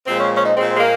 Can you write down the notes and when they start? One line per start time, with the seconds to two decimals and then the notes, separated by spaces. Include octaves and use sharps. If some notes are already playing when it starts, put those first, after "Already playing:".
0.06 A#2 F3 G#3 C4
0.19 C#4
0.36 C#4
0.43 D#4
0.57 A#2 G#3 C4
0.76 G#3
0.80 A#3